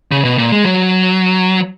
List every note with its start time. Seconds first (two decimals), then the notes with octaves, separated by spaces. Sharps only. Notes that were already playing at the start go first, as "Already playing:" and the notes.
0.12 C#3
0.25 B2
0.38 A#2
0.52 G#3
0.65 F#3